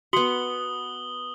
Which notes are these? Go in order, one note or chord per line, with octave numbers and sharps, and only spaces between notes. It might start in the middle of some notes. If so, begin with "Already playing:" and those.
B3 F#4 F#5 D#6 F#7 G7